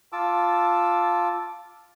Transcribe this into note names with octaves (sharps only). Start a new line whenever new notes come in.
F4 A5 D6 E6